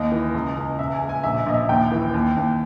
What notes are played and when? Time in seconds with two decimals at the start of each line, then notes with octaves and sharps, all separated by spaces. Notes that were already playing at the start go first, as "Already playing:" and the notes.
Already playing: D#2 D#5
0.12 E3
0.34 C#2
0.57 C#2
0.79 E1 E5
0.94 G#5
1.02 C#3
1.09 G#5
1.24 A#1 E5
1.39 E5
1.46 A#1 D#5
1.54 E5
1.69 D#2 G5
1.92 E3
2.14 D#2
2.37 D#2